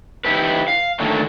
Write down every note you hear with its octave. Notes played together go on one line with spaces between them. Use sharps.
D#4 E4 G4 B4
F5
A#2 D3 D#3 F#3 A3 A#3